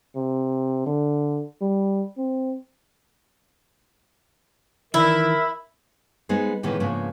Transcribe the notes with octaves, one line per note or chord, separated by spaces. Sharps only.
C3
D3
G3
C4
D#3 E3 E4 A#4 E5
G#3 B3 D#4 G#4 C5
A2 C3 D#3 E3 G#3 B3
G#2 C#3 F3 A#3 B3 D4